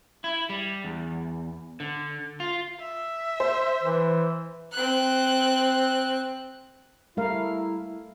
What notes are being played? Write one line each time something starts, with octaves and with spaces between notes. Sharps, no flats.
E4
G3
E2
D3
F4
E5
C5
E3
C4 F#6
G3 A3 E4 A#4 F5